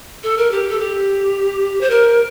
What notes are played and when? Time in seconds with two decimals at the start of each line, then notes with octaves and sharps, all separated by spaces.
0.23 A4
0.37 A#4
0.51 G4
0.69 A4
0.79 G4
1.81 C5
1.90 A#4